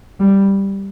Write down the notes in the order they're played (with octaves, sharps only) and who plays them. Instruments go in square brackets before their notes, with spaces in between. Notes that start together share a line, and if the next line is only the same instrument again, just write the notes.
[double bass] G3